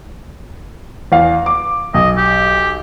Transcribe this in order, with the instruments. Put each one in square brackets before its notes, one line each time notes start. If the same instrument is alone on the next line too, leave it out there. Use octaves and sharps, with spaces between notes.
[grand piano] E2 F5
D6
[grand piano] B1 [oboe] D#5
[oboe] G4